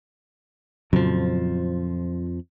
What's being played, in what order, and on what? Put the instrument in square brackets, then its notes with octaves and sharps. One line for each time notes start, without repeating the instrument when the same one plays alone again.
[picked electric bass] F2 F3 [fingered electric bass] A#2 C#3 F#3